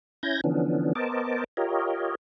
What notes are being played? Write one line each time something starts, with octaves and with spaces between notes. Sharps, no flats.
C#4 E4 G6 G#6 A#6
D3 E3 F3 B3 C#4 D4
B3 A#4 C5 D#5 A5 D6
F4 G4 A#4 C#5 D#5